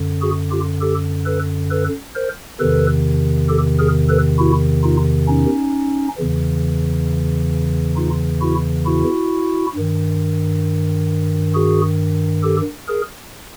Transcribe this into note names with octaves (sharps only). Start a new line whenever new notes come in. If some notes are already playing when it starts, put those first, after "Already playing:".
Already playing: F#2 D3
F#4 G#4
F4 G4
G4 A4
A4 B4
A4 B4
A#4 C5
E2 C3 D#3 A4 B4
G4 A4
G#4 A#4
A4 B4
E4 F#4
D#4 F4
C#4 D#4
E2 C#3 E3
D#4 F4
E4 F#4
E4 F#4
G2 D#3
F#4 G#4
G4 A4
G#4 A#4